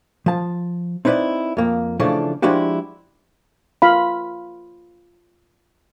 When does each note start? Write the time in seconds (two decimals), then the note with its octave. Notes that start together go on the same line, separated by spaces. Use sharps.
0.26 F3 A5
1.05 C4 D#4 E4 B4 D5
1.57 F2 A#3
2.00 C#3 E3 F3 A3 D4
2.42 F3 G#3 D4 E4 F#4 G4
3.82 F4 F5 B5